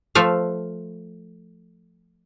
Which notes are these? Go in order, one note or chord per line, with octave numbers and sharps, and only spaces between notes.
F3 A3 F5